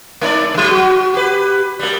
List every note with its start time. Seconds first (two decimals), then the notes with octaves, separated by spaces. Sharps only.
0.21 G#3 D#4 D5
0.54 D3 F#3
0.71 F#4
1.14 G4 B4
1.79 G3 G#3